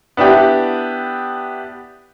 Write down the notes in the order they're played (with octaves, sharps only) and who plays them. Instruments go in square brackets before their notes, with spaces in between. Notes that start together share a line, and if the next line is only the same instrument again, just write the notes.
[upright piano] B3 D4 E4 G4